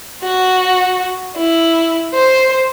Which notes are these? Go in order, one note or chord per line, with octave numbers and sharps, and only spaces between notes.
F#4
E4
C5